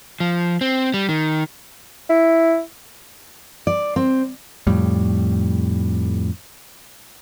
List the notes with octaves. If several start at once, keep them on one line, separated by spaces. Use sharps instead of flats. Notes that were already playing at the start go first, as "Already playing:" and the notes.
F3
C4
G3
D#3
E4
D5
C4
F2 A2 G3